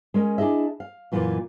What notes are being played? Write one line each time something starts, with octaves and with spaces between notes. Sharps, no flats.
G#3 C#4 A#4 D#5
D4 E4 G#4 D#5 E5
F5
F#2 A#2 E3 A#3 F4 B4